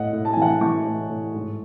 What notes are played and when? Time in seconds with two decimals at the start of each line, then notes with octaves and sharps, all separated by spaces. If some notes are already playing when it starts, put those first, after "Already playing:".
Already playing: A2 D#5 F#5
0.13 A2
0.25 A5
0.33 G#5
0.37 E3 F#5 A5
0.61 E3 A5 C#6
0.86 A2
1.10 A2
1.34 G#2